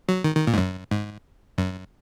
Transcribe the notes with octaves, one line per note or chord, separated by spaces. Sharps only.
F#3
D#3
D#3
A#2
G#2
F#2
G#2
F#2